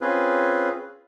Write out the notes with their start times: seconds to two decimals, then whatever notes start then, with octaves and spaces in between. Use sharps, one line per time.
0.01 C4 C#4 F4 G#4 B4